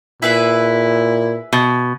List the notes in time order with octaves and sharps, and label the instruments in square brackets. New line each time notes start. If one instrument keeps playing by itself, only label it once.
[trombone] A#2 [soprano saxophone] E4 [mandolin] G#4 B4 E5
[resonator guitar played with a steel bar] B2